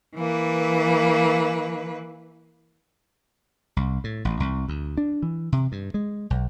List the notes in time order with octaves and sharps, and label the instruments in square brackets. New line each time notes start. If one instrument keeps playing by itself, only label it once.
[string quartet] E3 A#3 B4
[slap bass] C2
A2
A1
C2
D2
D4
E3
C3
G2
G#3
B1